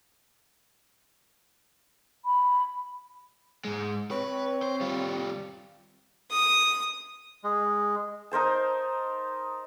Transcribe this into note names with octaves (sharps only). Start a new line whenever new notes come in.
B5
G#2 G#3
C4 B4 C#5
C5
G3 F4
D#6
G#3
D#4 A#4 C5 A5